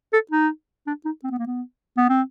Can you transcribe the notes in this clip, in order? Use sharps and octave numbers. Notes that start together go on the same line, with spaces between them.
A4
D#4
D4
D#4
C4
B3
A#3
B3
B3
C4